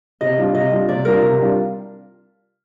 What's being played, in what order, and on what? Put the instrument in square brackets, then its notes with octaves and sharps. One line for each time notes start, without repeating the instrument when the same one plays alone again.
[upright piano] C3 [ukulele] D#5
[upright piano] G3 D4 F4
[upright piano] C3 [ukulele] D#5
[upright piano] G3 D4 F4
[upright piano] C3 [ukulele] D5
[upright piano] G3 D4 F4 [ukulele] A#4
[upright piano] C3
G3 D4 F4